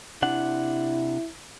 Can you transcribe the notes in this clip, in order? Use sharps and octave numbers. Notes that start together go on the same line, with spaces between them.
C3 D4 E4 F#5